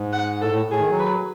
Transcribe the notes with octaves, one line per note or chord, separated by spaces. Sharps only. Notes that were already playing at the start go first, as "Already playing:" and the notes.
Already playing: G#2
F#5
A2 A4
A2
A2 G#4
D#3
F#3
B4